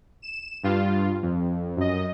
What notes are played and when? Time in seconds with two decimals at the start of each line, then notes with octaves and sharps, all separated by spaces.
0.22 E7
0.63 G2 F4
1.22 F2
1.77 F#2 D#5